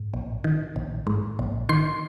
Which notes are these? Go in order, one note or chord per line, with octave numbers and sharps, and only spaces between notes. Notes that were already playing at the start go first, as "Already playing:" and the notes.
Already playing: G#2
A#1
D#3
A#1
G#2
A#1
D#3 C6